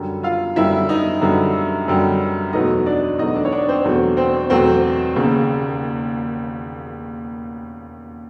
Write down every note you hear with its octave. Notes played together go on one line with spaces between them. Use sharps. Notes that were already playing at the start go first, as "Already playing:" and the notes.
Already playing: F#2 D3 G3
F4 F5
F#2 D3 G3 E4 E5
D#4 D#5
F#2 D3 G3
F#2 D3 G3
E2 B2 F#3 A3 D#4 D#5
D4 D5
E2 B2 F#3 A3 D#4 D#5
D4 D5
C#5
D4 D5
C4 C5
E2 B2 F#3 A3
C4 C5
E2 B2 F#3 A3 C4 C5
E1 D#2 C#3